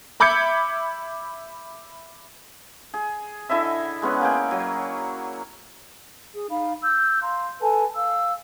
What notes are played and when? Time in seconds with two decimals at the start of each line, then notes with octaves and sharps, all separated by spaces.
0.20 E5 B5 D6 G6 G#6 C#7
2.94 G#4
3.49 D3 E4 D#5 E5
4.02 G#3 B3 C#4 F#5
4.21 A#3 G#4 G5
4.51 F#3
6.34 G#4
6.50 D#4 F5 B5
6.82 E6 G6
7.21 F5 A#5 C6
7.60 A4 B4 G#5 A5
7.95 F5 E6